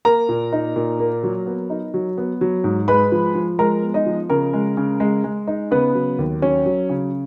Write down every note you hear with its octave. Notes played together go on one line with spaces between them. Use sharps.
A#3 A#4 A#5
A#2
D#4
A#2
A#3
F#3
B3
D#4
F#3
B3
F#3
G#2
G#3 B4 B5
F3
F3
G#3 A#4 A#5
B3
D#4 D#5
F3
C#3 A#4
G#3
C#3
G#3
G#3
D#4
C#3 B3 B4
F#3
D#2
F#3 C#4 C#5
F#3
C#3